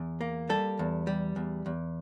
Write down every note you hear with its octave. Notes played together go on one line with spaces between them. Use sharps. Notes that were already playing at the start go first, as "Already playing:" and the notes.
Already playing: E2
A#3
G3 A4
E2
G3
E2
E2